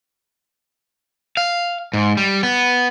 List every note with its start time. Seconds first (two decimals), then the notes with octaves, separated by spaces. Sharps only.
1.37 F5
1.93 G#2
2.17 G3
2.43 B3